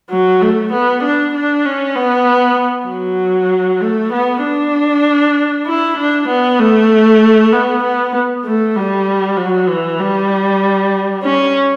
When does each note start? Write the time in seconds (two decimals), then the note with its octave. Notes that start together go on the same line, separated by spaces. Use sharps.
0.10 F#3
0.41 A3
0.72 B3
1.03 D4
1.34 D4
1.65 C#4
1.96 B3
2.88 F#3
3.81 A3
4.12 B3
4.43 D4
5.66 E4
5.98 D4
6.28 B3
6.59 A3
7.52 B3
7.83 B3
8.45 A3
8.76 G3
9.37 F#3
9.68 E3
9.99 G3
11.22 C#4